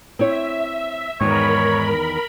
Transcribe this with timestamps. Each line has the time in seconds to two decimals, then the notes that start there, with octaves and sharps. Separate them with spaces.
0.19 C4 E4 C#5 E5
1.21 E2 G#2 D#3 A#4 C#5 B5